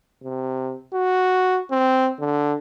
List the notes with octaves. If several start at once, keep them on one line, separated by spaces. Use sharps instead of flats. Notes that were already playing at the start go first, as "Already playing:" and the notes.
C3
F#4
C4
D3